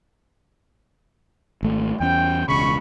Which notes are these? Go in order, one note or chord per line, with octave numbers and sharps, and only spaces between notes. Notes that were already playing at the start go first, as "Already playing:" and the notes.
G#1 A3
E2 C#4 G5
E1 C#2 C#3 B5 C#6